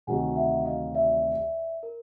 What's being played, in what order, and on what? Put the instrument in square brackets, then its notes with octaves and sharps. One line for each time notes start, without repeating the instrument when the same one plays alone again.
[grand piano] D2 C3 D#3 F#3 [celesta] F#5 G#5
[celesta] E5 F#5
D#5 F5
D5 E5
A#4